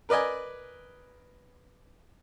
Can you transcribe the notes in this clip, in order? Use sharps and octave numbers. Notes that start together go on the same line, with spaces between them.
A#4 B4 D5 D#5 G#5